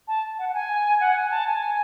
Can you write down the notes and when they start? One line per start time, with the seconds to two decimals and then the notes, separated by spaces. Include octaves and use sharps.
0.08 A5
0.39 F#5
0.49 F#5
0.54 G#5
1.00 F#5
1.16 G#5
1.31 A5
1.47 G#5